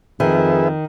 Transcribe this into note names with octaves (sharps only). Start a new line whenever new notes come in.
F2 D#3 G#4 B4 E5